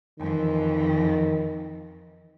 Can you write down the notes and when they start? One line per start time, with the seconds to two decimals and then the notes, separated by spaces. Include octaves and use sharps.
0.19 F2 D#3 E3